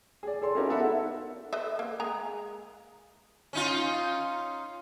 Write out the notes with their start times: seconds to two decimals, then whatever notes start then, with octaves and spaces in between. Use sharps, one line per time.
0.23 G#4 D5
0.42 G#4 A4 D5 C6
0.55 C#4 D#4 E4 F#4 G4 A#4
0.69 B3 D#4 A4 B4 E5 F#5
1.53 B4 D#5 E5
1.79 A#3
2.00 G#3 G#4 A#5
3.53 C#4 D#4 F4